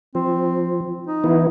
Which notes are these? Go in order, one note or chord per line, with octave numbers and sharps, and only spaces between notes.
F3 C4
D#4
E3 B3 E4